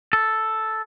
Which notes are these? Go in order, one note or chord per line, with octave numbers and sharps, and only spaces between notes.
A4